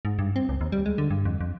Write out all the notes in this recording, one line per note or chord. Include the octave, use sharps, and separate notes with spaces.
G#2
G2
C4
C#2
D#2
G3
G#3
D3
G2
F2
F2